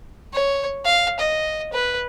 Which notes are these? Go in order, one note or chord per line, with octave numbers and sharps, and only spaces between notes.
C#5
F5
D#5
B4